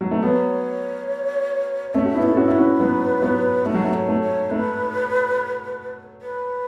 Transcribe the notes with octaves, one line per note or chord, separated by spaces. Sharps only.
F#3
A3
F#3 B3 C#5
A3 C#4 E5
F#4
B3 E4
A4
E4
C#4 F#4
E4 B4
C#4 F#4
F#3 B3
F#3 B3
A3 F#4
F#3
A3
C#5
A3
C#5
A3 B4
B4